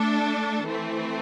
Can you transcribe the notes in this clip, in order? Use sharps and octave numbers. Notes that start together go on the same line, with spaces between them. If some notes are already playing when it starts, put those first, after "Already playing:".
Already playing: A3 D4 A4
E3 A3 C4